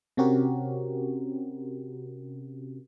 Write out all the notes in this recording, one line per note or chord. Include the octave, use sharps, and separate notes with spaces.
C3 C4 C#4 F#4 G4 A#4